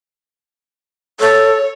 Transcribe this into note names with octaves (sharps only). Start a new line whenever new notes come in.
A4 C#5